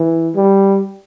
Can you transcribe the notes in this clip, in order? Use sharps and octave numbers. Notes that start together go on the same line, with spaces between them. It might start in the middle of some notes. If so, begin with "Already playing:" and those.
Already playing: E3
G3